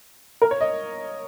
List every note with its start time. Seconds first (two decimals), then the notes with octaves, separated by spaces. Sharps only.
0.42 A#4
0.51 C#5
0.61 D#5